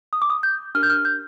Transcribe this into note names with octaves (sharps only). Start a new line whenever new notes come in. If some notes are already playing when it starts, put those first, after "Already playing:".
D#6
D6
D#6
G6
D4 G4 A#4 F6
G6
F6
G6